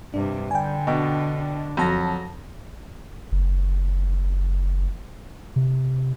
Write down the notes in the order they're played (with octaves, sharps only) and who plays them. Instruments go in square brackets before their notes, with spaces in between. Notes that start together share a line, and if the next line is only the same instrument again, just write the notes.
[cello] G2 [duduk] C3 [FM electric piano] D4
[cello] D3 [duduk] G3 [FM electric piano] G5 G#5
[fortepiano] B2 [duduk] D4 [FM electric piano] D#5 G5
[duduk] D4
[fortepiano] F2 [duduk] F#3 [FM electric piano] F#4 A5 A#6
[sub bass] F#1
C3